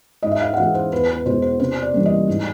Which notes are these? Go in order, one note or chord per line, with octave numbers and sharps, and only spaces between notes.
G#2 D#5
E5
F5
F#5
E3 G#3 F5
C5
E2 B4
B4
B2 G#3 C5
C5
C3 C5
D5
E3 G3 A#3
D#5
G#2